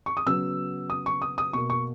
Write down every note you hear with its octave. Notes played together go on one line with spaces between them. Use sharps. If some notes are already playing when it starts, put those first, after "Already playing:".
C#6
D#6
C#3 F#3 B3 E6
D#6
C#6
D#6
D#6
B2 A#3 C#6
C#6